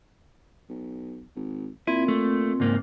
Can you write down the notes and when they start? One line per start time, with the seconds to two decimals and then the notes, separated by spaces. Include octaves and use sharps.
0.69 B1
1.36 G#1
1.87 A#2 C4 E4
2.08 A3
2.60 C#2 G#2 A#3